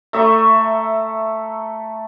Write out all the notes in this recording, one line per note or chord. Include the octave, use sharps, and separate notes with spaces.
A3 E5 A#5 C#6